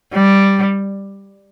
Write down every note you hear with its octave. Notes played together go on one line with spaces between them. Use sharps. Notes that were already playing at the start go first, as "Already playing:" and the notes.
G3